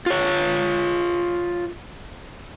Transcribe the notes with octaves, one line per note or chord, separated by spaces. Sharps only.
F4 C#5